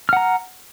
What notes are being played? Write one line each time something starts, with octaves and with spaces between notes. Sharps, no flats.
F#5 A#5 F6